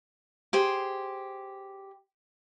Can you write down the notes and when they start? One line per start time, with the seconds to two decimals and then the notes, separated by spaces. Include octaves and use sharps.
0.53 G4 G#4 C5